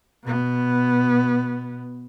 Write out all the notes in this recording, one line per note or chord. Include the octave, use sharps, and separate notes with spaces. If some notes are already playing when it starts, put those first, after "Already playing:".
B2 B3